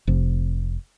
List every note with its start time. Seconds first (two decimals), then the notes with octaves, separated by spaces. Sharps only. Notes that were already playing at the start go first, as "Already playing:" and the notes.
0.07 F1 C3